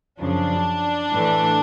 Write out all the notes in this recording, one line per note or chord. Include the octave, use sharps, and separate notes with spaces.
F#2 C#3 F3 D4
A2 E3 A3